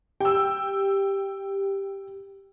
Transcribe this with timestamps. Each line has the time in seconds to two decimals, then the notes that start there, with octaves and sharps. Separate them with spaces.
0.21 G4 G5 E6